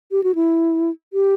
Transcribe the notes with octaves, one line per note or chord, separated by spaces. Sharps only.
G4
F#4
E4
G4